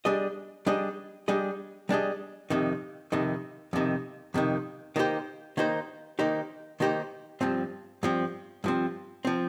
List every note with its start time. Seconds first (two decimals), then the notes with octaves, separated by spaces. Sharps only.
0.05 G3 D4 G#4 D#5
0.67 G3 D4 G#4 D#5
1.28 G3 D4 G#4 D#5
1.89 G3 D4 G#4 D#5
2.50 F2 C3 D#3
3.12 F2 C3 D#3
3.73 F2 C3 D#3
4.34 F2 C3 D#3
4.96 D#3 A#3 D#4 G4 C5
5.57 D#3 A#3 D#4 G4 C5
6.19 D#3 A#3 D#4 G4 C5
6.80 D#3 A#3 D#4 G4 C5
7.41 G2 F3 C4
8.03 G2 F3 C4
8.64 G2 F3 C4
9.25 F3 C4